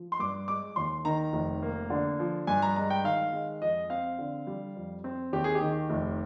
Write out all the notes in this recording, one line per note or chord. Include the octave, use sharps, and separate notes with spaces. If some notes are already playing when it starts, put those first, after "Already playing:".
Already playing: F3
C6
G2 D6
G#3 D6
D#2 C6
D#3 A#5
F1
A#3
D3
F3
G2 G#5
A#5
G#3 A#5
G5
D#3 F5
G#3
F2 D#5
C4 F5
D3
G3
F2
C4
D#2 G4
G#4
G4
D#3
F1